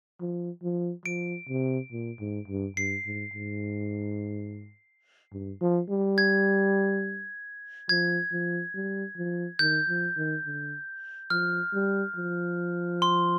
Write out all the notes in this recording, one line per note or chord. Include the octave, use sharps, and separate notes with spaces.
F3
F3
F3 D7
C3
A#2
G#2
G2
G2 C7
G#2
G#2
G2
F3
G3
G#6
F3 G#6
F3
G3
F3
D#3 G6
F3
D#3
D3
F3 F6
G3
F3
C6